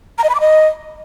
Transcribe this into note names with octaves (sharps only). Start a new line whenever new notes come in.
A#5
D#5
B5
D6
D#5